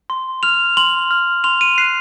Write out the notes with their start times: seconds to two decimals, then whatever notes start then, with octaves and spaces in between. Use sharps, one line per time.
0.10 C6
0.43 F6 F7
0.77 C6 F#7
1.11 F6
1.44 C6 F7
1.61 D#7
1.78 F#6 C7